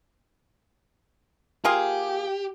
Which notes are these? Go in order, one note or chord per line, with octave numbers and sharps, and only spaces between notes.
A#3 F4 G4 G#4